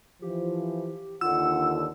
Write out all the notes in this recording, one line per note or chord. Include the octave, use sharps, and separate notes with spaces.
E3 F3 G4
D#2 D3 F4 F#5 E6